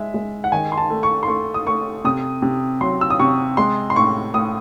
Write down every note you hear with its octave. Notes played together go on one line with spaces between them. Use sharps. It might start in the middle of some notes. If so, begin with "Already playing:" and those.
Already playing: G#3 E5
G#3
F#5
D#3 G#5
C6
A5
A3
C#6
C6
A3 C#6
D#6
A3 C#6
C3 D#6
C3
F#3 C6
E6
D#6
C3 C#6
G#3 C6
C6
A2 C#6
A2 D#6